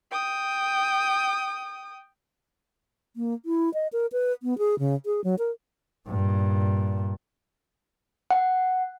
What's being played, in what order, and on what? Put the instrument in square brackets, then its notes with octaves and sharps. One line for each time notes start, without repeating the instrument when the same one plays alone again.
[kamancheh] G5 D#6
[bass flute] A#3
E4
D#5
A#4
B4
B3
G#4
C#3
G#4
F#3
A#4
[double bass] G2 A#2
[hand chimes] F#5